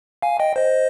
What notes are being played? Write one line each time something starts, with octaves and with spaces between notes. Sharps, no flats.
F5 G#5
D#5 G5
C5 D#5